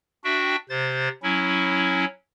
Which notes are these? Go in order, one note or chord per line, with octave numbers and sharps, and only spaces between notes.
D4 F#4 E5 G5
C3 C5 A6
F#3 C#4 E4